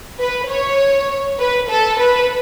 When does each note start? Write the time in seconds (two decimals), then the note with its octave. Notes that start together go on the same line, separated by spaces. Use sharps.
0.19 B4
0.49 C#5
1.39 B4
1.70 A4
1.99 B4